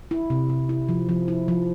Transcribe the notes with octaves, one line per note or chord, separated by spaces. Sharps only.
E4
C3
C3
E4
F3
F3
E4
F3